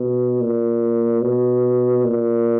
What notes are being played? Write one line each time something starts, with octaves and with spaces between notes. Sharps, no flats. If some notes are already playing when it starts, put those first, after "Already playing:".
Already playing: B2
A#2
B2
A#2